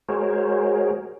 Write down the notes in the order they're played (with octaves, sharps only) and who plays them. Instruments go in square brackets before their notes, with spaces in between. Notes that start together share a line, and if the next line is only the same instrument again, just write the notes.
[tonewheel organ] G#3 F#4 G#4 A#4 C5 C#5